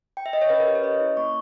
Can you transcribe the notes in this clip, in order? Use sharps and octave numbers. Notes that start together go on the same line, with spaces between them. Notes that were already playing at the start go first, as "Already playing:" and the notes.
G5
E5
D#5
C#5
C#4 B4
A#4
G4 B4
C#5
C#4 D#5
E4
A#3 C#6